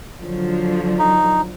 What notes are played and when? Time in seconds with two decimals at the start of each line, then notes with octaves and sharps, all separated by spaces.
0.19 D3 F3 F#3
0.99 D#4